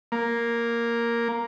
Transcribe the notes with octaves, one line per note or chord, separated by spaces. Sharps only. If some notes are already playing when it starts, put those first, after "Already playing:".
A#3